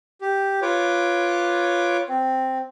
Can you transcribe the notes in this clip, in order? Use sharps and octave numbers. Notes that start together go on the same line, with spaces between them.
G4
F4 B4 C#5 D6
C4